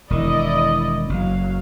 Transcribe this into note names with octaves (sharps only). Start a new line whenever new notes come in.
E1 D#3 E4 D5 D#5
F#1 F#3 F5